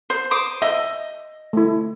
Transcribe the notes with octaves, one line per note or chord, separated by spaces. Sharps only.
C5
C5 D6 D#6
D#5 E5
A3 E4